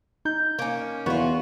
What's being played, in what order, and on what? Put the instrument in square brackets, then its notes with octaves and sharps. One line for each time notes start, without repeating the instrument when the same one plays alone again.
[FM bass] D#4 [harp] G6
[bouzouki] A#3 C#4
[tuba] E2 [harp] B3 [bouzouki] F4 F#4